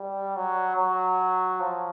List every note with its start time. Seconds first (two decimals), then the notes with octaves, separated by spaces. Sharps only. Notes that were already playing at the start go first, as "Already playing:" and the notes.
Already playing: G3
0.36 F#3
0.77 F#3
1.60 F3